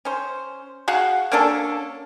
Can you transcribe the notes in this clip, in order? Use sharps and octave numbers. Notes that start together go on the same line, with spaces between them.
C#4 C5
F#4 G#4 F5 F#5
A#3 C#4 D4 A4